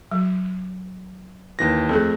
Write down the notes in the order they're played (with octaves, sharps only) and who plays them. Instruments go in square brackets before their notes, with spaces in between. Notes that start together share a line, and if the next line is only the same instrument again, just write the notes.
[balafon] F#3
[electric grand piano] D#2 E3 A#6
[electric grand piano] F2 A3 [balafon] G#4 A4